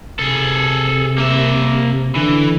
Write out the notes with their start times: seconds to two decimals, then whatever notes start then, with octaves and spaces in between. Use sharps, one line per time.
0.19 C3 G#4 A4
1.18 A#3 E5
2.15 D3 E3